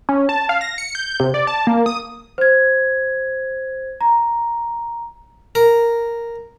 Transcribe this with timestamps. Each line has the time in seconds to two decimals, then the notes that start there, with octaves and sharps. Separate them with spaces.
0.09 C#4
0.29 A5
0.49 F5
0.61 A#6
0.78 C#7
0.95 G6
1.20 C3
1.34 D5
1.47 A5
1.67 A#3
1.86 D#6
2.38 C5 G#6
4.01 A#5
5.55 A#4